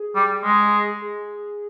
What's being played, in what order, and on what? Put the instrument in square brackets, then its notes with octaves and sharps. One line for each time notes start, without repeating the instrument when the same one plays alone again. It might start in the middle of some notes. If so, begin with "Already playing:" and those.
Already playing: [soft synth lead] G#4
[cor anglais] G3
G#3
[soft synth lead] G#4